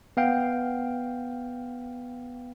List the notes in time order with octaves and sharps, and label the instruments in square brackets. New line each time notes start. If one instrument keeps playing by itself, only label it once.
[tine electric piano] B3 F5 G5